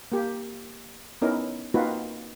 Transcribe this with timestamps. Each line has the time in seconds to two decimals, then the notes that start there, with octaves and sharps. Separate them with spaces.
0.12 A#3 G4
1.22 B3 C#4 D#4 E4 A#4
1.74 A#3 C4 D#4 F4 F#4 B4